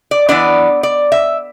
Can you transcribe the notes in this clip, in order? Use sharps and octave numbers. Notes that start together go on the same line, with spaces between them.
D5
E3 B3 D4 D5
D5
E5